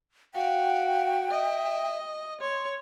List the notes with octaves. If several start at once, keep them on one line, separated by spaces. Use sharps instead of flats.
F#4 F5 G5
D#5 E5
C#5 C6